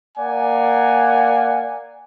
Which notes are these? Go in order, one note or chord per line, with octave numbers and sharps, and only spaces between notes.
A#3 D5 F#5 G#5